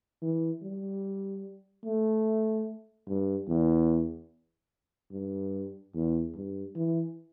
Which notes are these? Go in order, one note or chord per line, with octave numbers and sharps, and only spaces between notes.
E3
G3
A3
G2
E2
G2
E2
G2
E3